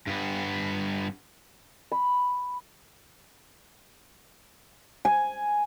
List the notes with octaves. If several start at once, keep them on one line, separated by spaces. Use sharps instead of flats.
G2 B3
B5
G#5